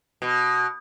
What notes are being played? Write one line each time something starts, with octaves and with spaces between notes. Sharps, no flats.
B2